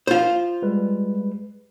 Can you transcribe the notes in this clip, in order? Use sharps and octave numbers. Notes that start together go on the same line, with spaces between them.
F4 C5
G3 G#3 B4